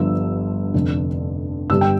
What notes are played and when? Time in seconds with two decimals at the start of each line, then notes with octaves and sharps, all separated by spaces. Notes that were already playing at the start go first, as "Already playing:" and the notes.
Already playing: G1 G2 D3 F3 E6
0.74 F1 F2 D3
1.70 G1 G2 D3 G3 D4 E6
1.81 G5